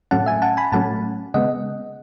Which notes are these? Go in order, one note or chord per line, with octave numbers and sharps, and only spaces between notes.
A2 F#3 A3 C#4 F#5 A5
E5 G#5
F#5 A5
G#5 B5
A2 F#3 A3 C#4 F#5 A5
C#3 G#3 B3 D#5 F#5